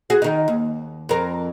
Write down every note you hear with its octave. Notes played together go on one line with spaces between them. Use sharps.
F#4 G#4
D#3 D#4
D#2
F2 A#4